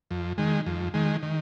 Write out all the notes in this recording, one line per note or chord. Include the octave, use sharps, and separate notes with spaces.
F2
D#3 G#3
F2
D#3 G#3
D#3